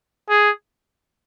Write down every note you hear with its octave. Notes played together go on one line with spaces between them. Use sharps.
G#4